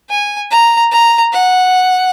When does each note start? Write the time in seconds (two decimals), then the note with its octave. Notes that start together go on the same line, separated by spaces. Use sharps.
0.10 G#5
0.51 A#5
0.91 A#5
1.32 F#5